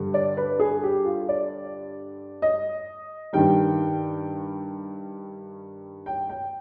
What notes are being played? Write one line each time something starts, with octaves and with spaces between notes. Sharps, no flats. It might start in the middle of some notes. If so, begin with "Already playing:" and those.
Already playing: G2 D3 G3
D5
B4
G#4
G4
F4
D5
D#5
G2 D#3 G3 G5
G5
G5